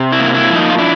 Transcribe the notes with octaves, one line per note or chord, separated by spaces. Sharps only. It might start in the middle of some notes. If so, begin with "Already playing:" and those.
Already playing: C3
E4
A#3
E4
F3
D#4
F4
D4 E4